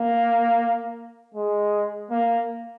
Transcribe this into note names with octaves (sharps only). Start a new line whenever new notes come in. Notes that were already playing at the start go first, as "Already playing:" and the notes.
Already playing: A#3
G#3
A#3